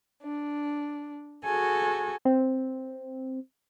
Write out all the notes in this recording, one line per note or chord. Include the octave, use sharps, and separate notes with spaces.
D4
F#4 G#4 A4 G#5
C4